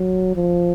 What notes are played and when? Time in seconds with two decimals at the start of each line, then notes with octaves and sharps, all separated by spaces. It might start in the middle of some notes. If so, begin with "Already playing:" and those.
Already playing: F#3
0.36 F3